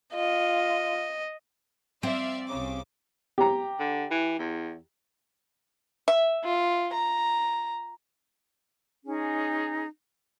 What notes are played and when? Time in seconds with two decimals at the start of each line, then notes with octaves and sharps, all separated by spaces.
0.15 F4 D#5
2.03 C4 D5 E5 F5
2.47 C2 C#3 D6
3.38 G4 A#5
3.80 D3
4.11 E3
4.39 E2
6.08 E5
6.44 F4
6.93 A#5
9.05 C#4 D#4 G#4